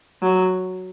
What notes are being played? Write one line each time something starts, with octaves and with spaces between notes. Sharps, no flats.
F#3